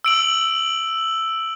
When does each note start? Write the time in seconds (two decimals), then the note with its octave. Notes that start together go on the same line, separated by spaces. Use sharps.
0.04 E6 D7 F#7